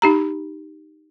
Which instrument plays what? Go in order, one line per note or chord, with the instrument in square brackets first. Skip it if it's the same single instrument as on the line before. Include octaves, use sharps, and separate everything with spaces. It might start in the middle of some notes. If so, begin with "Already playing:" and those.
[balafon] D#4 G4 A#5